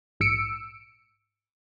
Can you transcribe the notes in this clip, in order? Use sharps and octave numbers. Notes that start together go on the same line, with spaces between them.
A#1 G#2 E6 C#7 D7